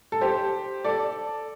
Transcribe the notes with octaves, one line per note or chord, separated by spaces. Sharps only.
A4
G4 C5
A4 D5